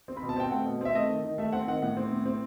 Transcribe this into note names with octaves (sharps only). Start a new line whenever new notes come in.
C4
B5
B2
A5
C4 G5
A3 F#5
B2
C4 E5
A3 D#5
D#3
D#3
A3 E5
C4 F#5
D#3 F#5
A2 F#5
C4
A2
C4